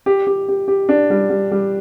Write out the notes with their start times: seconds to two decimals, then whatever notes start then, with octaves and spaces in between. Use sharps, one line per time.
0.06 G4
0.27 G4
0.48 G4
0.68 G4
0.89 D4
1.10 G3
1.30 G3
1.51 G3